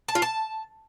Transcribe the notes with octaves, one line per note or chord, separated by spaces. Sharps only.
A5
F4
A5